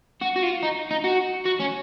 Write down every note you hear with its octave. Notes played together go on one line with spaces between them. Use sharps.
F#4
F#4
F4
D#4
D#4
F#4
F#4
C#4